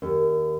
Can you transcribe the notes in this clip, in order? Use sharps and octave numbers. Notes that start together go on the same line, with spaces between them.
D#2